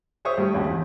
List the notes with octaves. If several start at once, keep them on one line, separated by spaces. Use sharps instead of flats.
G#4 C5 C#5 E5 C#6 D#6
G2 G3 A3
G#1 D#2 G#2 C#3 G4
E2